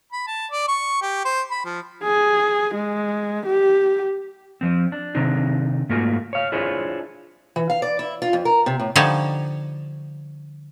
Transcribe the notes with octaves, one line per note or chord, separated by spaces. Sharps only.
B5
A5
D5
C#6
G4
C5
B5
F3
G#4
G#3
G4
F3 C4
D4
C3 D#3 C4 D4 D#4
G#2 A3 A#3 F4 F#4
C#5 F5
D4 E4 F4 G#4 C5 C#5
E3
F5
D5
E4
F4
F2
A#4
C3
A2
D3 F3 G3 D#4 C#5 A5